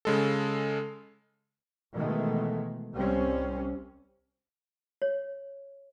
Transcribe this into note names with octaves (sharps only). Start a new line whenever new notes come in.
C#3 G#3 A4
B2 D#3 E3 G#3 A3
C2 G3 C4 C#4
C#5